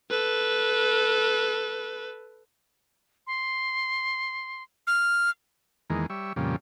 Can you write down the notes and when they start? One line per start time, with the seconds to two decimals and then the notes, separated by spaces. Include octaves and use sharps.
0.10 A4 B4
3.27 C6
4.87 F6
5.90 E2 D#3 G#3 A#3
6.10 G3 C#5 E5
6.36 F2 A#2 C#3 G3